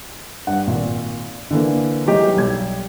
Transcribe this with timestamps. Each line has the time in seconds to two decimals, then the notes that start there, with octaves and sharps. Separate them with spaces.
0.47 G2 F#5
0.67 G#1 A#2
1.51 D3 E3 A#3
2.06 E3 F#3 G#3 D#4 G4
2.36 B1 G3 G#6